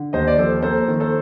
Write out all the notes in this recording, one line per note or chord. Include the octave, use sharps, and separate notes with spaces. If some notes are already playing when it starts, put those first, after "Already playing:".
Already playing: D3
D#2 C5 D#5
D5
F3 A4 C5
A#3 A4 C5
D#3
A4 C5